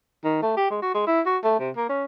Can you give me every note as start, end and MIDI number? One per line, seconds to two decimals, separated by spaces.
0.24 0.40 51
0.42 0.55 57
0.57 0.68 67
0.71 0.80 56
0.82 0.93 66
0.94 1.02 56
1.07 1.21 64
1.26 1.37 66
1.44 1.59 57
1.60 1.70 48
1.76 1.87 58
1.89 2.05 61